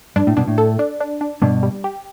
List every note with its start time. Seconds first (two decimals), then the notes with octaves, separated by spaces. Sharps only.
0.16 G2 D4
0.27 A2
0.37 G2 B2 D4
0.47 A2
0.58 A4
0.79 D4
1.01 D4
1.21 D4
1.42 G2 B2 D4
1.63 G3
1.84 G4